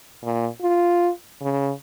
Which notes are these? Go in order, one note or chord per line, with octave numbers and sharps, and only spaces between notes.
A#2
F4
C#3